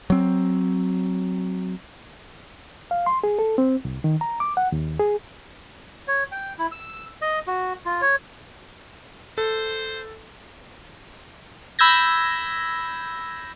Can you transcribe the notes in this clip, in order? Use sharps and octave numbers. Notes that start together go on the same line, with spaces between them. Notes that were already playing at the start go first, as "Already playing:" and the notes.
F#3 C4
F5
C6
G#4
A4
C4
C2
D#3
A#5
D6
F#5
D#2
G#4
C#5
G5
E4
E6
D#5
F#4
F4
C#5
A4 C5
B5 E6 G6 G#6 A#6